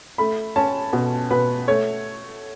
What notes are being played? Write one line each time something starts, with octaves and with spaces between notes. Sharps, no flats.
A3 B5
C#4 A5
B2
B2 B4
A3 C#5